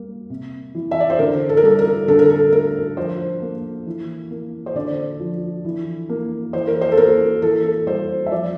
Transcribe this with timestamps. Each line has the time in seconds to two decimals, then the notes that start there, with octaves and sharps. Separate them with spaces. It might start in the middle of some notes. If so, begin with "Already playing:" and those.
Already playing: G3 A#3
0.30 C3
0.75 E3
0.91 E5
1.00 D5
1.10 C5
1.19 D3 A#4
1.49 A4
1.57 A#4
1.63 G3 A4
1.79 A#4
2.08 D3 A4
2.19 A#4
2.30 A4
2.52 A3 A#4
2.97 F3 C5
3.42 A#3
3.86 E3
4.31 A#3
4.66 C5
4.75 D3 D5
5.20 F3
5.65 E3
6.09 A#3
6.53 E3 C5
6.67 A#4
6.81 C5
6.92 A4
6.97 A#3 A#4
7.42 E3 A4
7.63 A4
7.87 G3 C5
8.26 E5
8.31 F3 D5